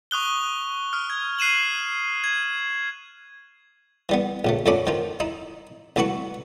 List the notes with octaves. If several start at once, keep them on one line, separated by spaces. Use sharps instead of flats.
C#6 D#6 F#6 G7
D#6 F6
G#6
F#6 C7 D#7 E7 F#7
G#6
E3 G3 B3
A#1 C#3 A3
F2 D3 A3 C#4 B5 D6
D#3 F3 F4
D#4 E4
C2 E3 A3 E4 F#4 C#6